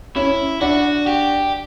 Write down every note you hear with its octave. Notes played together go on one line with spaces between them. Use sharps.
C#4 E4
D4 F#4
G4